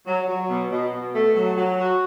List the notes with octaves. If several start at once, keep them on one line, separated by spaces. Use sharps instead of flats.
F#3
F#3
B2
B2
B2
A3
F#3
F#3
F#4